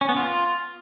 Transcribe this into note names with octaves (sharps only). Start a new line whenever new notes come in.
C#4
B3
F4